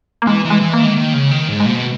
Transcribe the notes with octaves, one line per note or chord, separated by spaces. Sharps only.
A#3
E3 G#3
E3
G#3
E3
A#3
D#3 G#3
D#3 A#3
C#3
D#3
G#2
G#3
B2 A#3